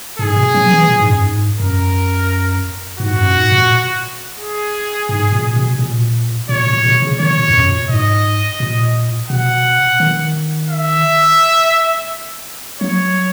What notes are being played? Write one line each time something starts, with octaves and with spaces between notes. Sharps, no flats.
G#2 G#4
B2
F#3
E3
A#2
G#2
F#2
G#2
F#2 A#4
G#2 F#4
F#2
A#2
G#2
A#2
G#4
G#2
A#2
B2
A#2
A#2 C#5
A#2
B2
C#3
D#3 C#5
A#2
E2
F#2
B2
A#2
G#2 D#5
A#2
B2 F#5
D#3
E5
F#3 C#5